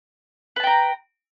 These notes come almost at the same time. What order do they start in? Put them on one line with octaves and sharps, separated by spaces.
B4 A5 G5 A#5